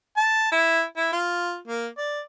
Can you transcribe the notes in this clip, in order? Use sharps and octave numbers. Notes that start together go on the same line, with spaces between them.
A5
E4
E4
F4
A#3
D5